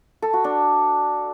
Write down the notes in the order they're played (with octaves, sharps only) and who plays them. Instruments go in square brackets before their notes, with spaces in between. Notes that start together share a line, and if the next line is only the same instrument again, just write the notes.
[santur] A4
F#4
D4